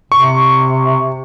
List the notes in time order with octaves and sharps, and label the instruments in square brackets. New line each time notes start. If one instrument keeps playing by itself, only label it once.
[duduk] C3 [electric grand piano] C#6